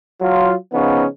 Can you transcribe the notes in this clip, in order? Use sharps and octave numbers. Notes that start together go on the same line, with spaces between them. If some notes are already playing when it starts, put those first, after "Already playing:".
F#3 F4
C#3 F3 B3 C#4 D#4